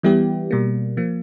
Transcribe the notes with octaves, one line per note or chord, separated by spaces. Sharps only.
E3 G3 B3 E4 G4
B2 G3 A#3
F3 A#3